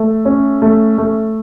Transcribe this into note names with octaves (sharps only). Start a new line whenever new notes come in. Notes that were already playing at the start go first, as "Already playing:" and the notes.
Already playing: A3
C#4
A3
A3